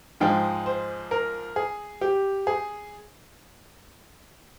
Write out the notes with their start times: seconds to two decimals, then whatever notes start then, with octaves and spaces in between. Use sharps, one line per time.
0.20 G#2 F3 G#3 G5
0.66 C5
1.11 A#4
1.56 G#4
2.01 G4
2.47 G#4